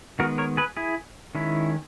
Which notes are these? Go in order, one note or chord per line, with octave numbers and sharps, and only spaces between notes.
D#3 G#3 B3 F#4 A#4
A#4 C#5
G#4 B4
E4 G#4
D#3 G#3 C#4 E4